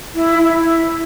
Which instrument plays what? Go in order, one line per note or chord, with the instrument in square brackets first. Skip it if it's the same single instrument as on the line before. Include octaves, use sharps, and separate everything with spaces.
[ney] E4
E4